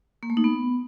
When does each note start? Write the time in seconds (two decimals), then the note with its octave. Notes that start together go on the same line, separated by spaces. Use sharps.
0.23 A#3
0.30 A3
0.37 D#4
0.44 B3